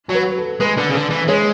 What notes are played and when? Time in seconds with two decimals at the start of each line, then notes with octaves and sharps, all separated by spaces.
0.09 F#3
0.15 B4
0.38 A4
0.60 G#3 B4
0.77 D3
0.89 C#3
0.94 D3
1.11 E3
1.28 G#3 C#5